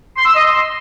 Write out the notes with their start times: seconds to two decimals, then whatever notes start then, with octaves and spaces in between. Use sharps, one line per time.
0.16 C6
0.25 E6
0.34 D#5
0.44 C6